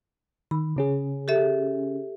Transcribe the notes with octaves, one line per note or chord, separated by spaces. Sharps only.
D#3 B5
C#3 C#4 G#4
G4 A4 E5